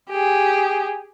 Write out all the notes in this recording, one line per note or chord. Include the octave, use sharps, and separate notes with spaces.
G4 G#4